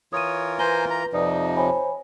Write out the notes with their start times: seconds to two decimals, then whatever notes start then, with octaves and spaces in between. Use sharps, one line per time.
0.13 E3 F4 A#4 C#5 D#6 D#7
0.59 B4 C5 G#5 A#5 G7
0.90 A#5
1.13 F2 C3 F3 D#4 D5 D#6
1.57 C5 C#5 G#5 B5